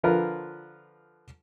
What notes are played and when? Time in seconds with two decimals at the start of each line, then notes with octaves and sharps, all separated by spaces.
0.03 D3 F3 F4 A#4 B4